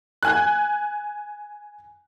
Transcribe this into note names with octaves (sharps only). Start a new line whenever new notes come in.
G#5 F#6